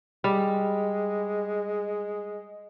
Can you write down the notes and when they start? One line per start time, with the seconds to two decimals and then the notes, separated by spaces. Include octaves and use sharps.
0.24 G3 G#3